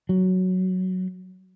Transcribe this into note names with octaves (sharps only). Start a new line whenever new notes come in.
F#3